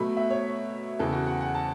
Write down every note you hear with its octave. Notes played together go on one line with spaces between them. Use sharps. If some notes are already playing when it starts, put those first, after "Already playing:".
Already playing: B2 F#3 A3 B5
E5
C#5
E2 C#3 E3 A4
F#4
F#5
F#5
A5